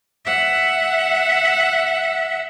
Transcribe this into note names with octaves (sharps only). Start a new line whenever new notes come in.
E5 F#5